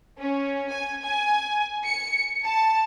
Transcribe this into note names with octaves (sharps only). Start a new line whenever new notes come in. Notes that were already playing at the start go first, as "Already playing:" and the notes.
C#4
G#5
G#5
C#7
A5